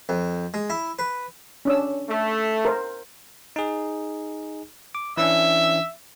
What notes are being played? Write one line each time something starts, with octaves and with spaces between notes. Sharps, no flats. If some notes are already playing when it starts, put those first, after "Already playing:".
F2
G#3
E4
B4
C#4 D4 E6
A3
A#4 C5
D#4 G#4
D6
E3 C#4 D4 E5